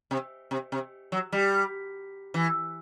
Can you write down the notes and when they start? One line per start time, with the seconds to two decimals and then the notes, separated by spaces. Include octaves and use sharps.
0.11 C3
0.51 C3
0.72 C3
1.12 F#3
1.32 G3
2.34 E3